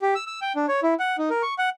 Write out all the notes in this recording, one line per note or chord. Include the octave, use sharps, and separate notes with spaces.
G4
E6
E6
G5
D4
C#5
E4
F#5
D#4
A#4
C#6
F#5